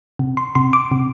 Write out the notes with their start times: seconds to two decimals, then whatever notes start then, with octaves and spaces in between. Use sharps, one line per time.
0.19 C3
0.37 C6
0.55 C3 C6
0.73 D6
0.91 C3